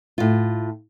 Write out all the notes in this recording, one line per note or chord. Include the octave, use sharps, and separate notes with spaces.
A2 F4